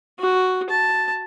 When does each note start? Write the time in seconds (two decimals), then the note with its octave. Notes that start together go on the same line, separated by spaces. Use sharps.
0.20 F#4
0.70 A5